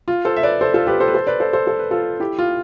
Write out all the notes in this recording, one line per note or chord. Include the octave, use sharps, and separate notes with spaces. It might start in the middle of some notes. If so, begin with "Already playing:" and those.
F4
A4 C5
E5
B4 D5
A4 C5
F4 A4
G4 B4
A4 C5
B4
A4 C5
B4 D5
A4 C5
A4 C5
A4
B4
F4 A4
E4 G4
F4